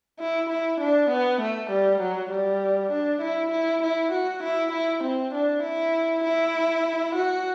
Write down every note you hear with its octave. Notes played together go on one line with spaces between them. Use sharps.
E4
E4
D4
B3
A3
G3
F#3
G3
D4
E4
E4
E4
F#4
E4
E4
C4
D4
E4
E4
F#4